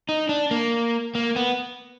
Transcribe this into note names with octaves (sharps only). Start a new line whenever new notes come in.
D#4
D4
A#3
A#3
B3